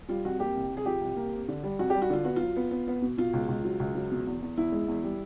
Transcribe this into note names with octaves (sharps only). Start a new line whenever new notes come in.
G3 F4
F2 F#4
A#3 G4
C2
C3
G#4
F3 G4
C2
A#3
C4
D3
G3
F2 F#4
G4
G3
F#4
D3 F4
B3 F#4
F#3 F4
B3
B3
B3
B2
B2 F4
C#2
C#2
F#3
C#2
F#3
B2
E2
E2
E2 E4
G#3
E2
G3